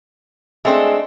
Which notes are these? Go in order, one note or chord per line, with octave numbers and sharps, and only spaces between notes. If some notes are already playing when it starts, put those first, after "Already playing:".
G#3 A3 C4 D4